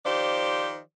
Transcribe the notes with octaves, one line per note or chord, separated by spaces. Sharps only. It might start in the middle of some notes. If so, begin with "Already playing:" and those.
D#3 F3 G4 C5 D5